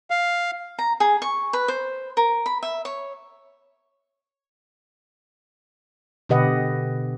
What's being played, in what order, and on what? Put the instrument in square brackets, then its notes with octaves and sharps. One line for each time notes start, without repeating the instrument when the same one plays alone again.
[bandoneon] F5
[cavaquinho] A#5
G#4
C#6
B4
C5
A#4
B5
E5
C#5
[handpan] B2 D3 G4 B4 D#5 F#5